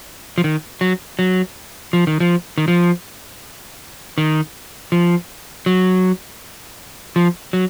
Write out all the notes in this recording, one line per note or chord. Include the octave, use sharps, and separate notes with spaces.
F3
D#3
F#3
F#3
F3
D#3
F3
D#3
F3
D#3
F3
F#3
F3
F#3